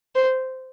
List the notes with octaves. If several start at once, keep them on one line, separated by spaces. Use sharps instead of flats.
C5